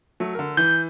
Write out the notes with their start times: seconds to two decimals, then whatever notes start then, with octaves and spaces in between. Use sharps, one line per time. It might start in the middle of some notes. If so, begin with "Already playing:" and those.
0.20 F#3 A3
0.35 D3 A#4
0.57 E3 G6